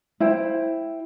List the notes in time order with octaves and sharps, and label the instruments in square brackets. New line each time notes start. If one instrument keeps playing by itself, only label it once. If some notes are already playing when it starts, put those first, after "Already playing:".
[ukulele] E4 C5 G5